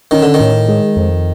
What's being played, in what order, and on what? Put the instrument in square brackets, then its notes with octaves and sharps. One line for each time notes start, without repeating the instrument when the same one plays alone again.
[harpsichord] D#3 [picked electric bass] C#4
[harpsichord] D3
D#3
[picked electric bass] A2
G#3
F2